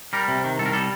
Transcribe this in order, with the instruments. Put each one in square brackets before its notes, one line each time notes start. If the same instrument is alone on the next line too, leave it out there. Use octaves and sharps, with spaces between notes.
[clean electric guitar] G3 A#4
C3
D#3
C2 A4
A#4
G3 A4